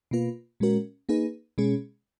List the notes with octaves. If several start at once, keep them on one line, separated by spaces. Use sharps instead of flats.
B2 A#3 F4 B4
A#2 G#3 C#4 F#4 A#4
A#3 D#4 G#4 B4
B2 G#3 C#4 G#4